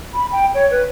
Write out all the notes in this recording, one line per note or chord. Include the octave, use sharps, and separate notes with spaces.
B5
G5
C#5
B4